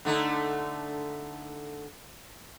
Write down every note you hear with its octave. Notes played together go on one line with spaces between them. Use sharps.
D3 A3 D#4